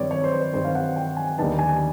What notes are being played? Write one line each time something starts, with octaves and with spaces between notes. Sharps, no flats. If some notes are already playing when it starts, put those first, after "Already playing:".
Already playing: G2 D#3 G3 C4 C#5 D5
C#5
C5
B4
G2 D#3 G3 C4 C5
F5
F#5
G5
G#5
D#2 D3 G3 B3 D#4 A5
G#5